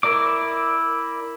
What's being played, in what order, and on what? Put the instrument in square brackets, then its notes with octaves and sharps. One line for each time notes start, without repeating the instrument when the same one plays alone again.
[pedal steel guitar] E4 A#4 D5 D6